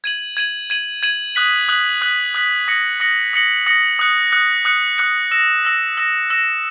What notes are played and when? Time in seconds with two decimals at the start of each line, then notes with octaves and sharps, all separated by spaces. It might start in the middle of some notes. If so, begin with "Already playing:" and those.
0.04 G#6 D#7 F#7
0.37 G#6 D#7 F#7
0.70 G#6 D#7 F#7
1.03 G#6 D#7 F#7
1.35 D#6 F#6 B6 F#7
1.68 D#6 F#6 B6 F#7
2.01 D#6 F#6 B6 F#7
2.34 D#6 F#6 B6 F#7
2.68 D#6 A#6 C#7 F#7
3.00 D#6 A#6 C#7 F#7
3.33 D#6 A#6 C#7 F#7
3.67 D#6 A#6 C#7 F#7
3.99 D#6 F#6 C#7
4.32 D#6 F#6 C#7
4.65 D#6 F#6 C#7
4.98 D#6 F#6 C#7
5.31 E6 A#6 E7
5.65 E6 A#6 E7
5.97 E6 A#6 E7
6.30 E6 A#6 E7